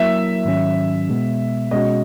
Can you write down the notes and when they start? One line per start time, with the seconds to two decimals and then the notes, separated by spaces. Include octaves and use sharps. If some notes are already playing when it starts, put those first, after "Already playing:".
Already playing: F#3 A#3 E4 A#4 E5
0.45 G#2 D#3 F#3 C#4
1.09 B2 G#3 B3
1.71 B2 G#3 C#4 F#4 D#5